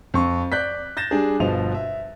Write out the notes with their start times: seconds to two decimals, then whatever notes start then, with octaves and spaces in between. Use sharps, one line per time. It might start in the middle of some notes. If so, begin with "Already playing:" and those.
0.14 F2 C#6
0.52 D5 F#6 G6 B6
0.97 G6 A6 A#6 E7
1.11 G3 D4 G#4
1.40 G1 B2 F3 D#5 F7
1.74 E5